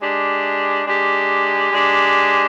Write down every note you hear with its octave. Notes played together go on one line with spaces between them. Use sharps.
G#3 D4 G4
G#3 D4 G4
G#3 D4 G4